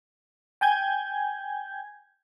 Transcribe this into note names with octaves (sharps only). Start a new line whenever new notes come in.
G5 G#5 G6 G#6